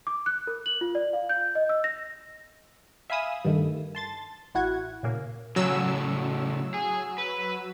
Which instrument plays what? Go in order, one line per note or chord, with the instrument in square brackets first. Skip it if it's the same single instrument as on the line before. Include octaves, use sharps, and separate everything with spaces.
[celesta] D6
F#6
A#4
F#7
F4
D5
F5
G6
D#5
E6
A#6
[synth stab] E5 F5 G#5 B5 D#6 E6
G2 D#3 A3
A5 C6 A6
A1 E4 F#4 F#5 G#6
A#2 C#3 A#3
[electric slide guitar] A2 C#3 [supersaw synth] F#3 E6
[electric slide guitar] G#4
B4